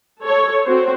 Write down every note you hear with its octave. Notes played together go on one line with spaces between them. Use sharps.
A4 C#5
C4 F#4 C5